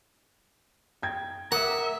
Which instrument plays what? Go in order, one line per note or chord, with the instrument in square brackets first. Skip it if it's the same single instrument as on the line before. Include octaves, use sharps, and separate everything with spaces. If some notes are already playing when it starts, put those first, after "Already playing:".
[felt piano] G5 G#6
[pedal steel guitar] A#4 D6 D#6 [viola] E5 [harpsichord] F#5